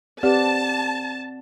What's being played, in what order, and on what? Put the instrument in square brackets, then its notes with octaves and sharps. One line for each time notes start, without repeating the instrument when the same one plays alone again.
[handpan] C4 D5 F#5 [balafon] G4 B4 [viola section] A5